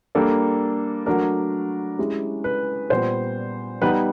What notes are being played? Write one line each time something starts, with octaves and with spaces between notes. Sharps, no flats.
G3 A#3 D4 A4
F#3 A3 D4 A#4
G#3 C#4 E4 G4
B4
A#2 G3 B3 C5
G3 B3 D#4 B4